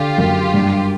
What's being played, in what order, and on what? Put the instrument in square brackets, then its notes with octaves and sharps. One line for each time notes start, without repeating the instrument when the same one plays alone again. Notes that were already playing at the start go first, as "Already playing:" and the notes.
Already playing: [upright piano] D3 [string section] F4 G4
[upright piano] F#2
G2